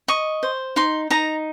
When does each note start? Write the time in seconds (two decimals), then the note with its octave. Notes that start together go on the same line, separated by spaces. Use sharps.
0.08 D#5 C#6
0.43 C5
0.76 D#4 C6
1.10 D#4 A#5